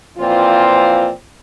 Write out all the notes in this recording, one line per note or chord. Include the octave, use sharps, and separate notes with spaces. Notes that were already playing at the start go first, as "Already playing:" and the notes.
A#2 E3 F3 C4 F4